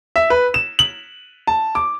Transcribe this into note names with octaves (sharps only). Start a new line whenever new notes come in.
E5
B4
E7
F#7
A5
D6